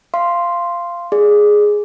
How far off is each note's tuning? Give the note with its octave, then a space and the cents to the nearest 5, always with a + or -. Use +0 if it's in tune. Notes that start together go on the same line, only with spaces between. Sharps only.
F5 -15 C6 +0
G#4 +0 D5 +0